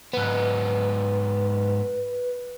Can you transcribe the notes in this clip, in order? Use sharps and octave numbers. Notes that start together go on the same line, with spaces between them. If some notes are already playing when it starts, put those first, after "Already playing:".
G#2 B3 B4